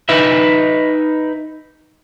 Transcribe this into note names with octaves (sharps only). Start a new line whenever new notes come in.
D#4 B4 E5